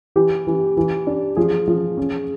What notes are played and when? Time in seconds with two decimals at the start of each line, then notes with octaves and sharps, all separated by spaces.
0.16 E3 G4
0.47 E3
0.77 E3
1.07 D4
1.37 F3 G#4
1.68 F3
1.97 C#4